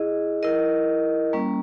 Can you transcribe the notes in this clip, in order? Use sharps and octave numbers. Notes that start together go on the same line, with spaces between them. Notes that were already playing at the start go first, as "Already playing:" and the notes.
Already playing: E4 G#4 D#5
E4 A#4 D#5
G3 A#3 C#4